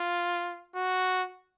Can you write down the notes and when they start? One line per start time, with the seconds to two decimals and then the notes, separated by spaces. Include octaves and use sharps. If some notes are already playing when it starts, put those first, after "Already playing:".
Already playing: F4
0.75 F#4